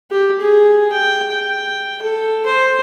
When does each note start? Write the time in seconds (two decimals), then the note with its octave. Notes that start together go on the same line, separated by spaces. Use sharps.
0.11 G4
0.40 G#4
0.92 G5
1.31 G5
2.02 A4
2.46 C5